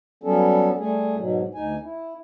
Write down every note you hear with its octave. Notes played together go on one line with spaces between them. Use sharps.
F#3 G3 B3 C#4 A4
G3 A3 G#4
G#2 B2 F#3
D2 D#4 G#5
E4